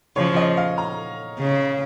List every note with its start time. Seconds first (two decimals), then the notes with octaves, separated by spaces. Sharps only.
0.16 C#3 F3 C#5
0.36 D#5
0.57 F5
0.78 A#5
1.39 C#3